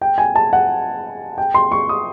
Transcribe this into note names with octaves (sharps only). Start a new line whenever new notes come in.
G5
G#5
A5
F#5
G5
C6
C#6
D#6